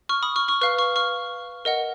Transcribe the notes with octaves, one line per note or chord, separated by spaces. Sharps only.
C#6 F6
B5 D#6
C#6 F6
C#6 F6
B4 F5 C#6 F6
C#6 F6
C#6 F6
A#4 D#5 F#5